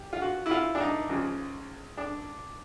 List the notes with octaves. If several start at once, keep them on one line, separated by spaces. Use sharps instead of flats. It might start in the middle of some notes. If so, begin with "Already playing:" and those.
Already playing: G4
F4
F#4
E4
F4
D4
D#4
C#2 C#3 F3
D4